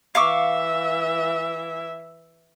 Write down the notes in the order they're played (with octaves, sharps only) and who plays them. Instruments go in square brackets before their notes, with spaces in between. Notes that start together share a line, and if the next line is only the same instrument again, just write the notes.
[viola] E3 E5 [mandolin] F5 C#6 D6